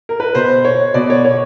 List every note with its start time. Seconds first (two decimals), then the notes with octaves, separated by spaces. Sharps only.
0.09 A#4
0.20 B4
0.35 B2 C5
0.65 C#5
0.94 B2 D5
1.10 C#5
1.25 C#5